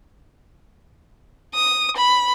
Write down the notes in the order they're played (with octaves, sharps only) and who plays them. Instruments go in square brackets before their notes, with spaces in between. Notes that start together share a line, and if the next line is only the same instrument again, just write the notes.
[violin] D#6
B5